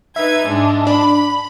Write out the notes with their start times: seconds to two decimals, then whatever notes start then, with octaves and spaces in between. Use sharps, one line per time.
0.16 D#4 B4 E5 G#6
0.47 G#2 G#3 D4
0.87 D4 B5